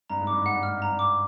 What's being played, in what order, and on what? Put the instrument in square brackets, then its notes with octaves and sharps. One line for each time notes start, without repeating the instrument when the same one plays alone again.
[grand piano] G2 [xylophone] A#5
[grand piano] G#2
[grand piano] G2 [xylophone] D6
[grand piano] G#2 [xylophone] F#5
[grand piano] G2
[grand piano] G#2 [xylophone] F6
[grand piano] G2
[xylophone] A#5
[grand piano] G2
[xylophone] D6